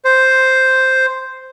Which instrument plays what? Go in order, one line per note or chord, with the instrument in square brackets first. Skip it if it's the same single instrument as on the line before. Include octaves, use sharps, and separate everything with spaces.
[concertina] C5